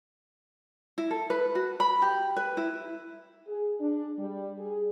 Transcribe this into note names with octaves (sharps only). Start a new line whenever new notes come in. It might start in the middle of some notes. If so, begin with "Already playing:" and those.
E4
A4
B4
F#4
B5
G4
B4
E4
G#4
D4
G3
G#4